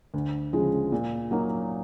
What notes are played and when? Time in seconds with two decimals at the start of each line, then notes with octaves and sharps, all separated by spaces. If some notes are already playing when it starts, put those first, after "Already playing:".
0.14 D2
0.53 C#3 F3 G#3
0.92 A#2
1.31 F#3 A#3 D#4